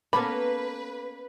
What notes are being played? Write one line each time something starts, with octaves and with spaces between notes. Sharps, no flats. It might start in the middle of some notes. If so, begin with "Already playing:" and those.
A#3 B3 C#4 A4 B4 B5